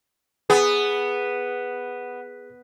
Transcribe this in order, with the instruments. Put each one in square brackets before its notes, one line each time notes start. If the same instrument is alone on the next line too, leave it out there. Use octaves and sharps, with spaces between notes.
[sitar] B3 [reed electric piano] G#4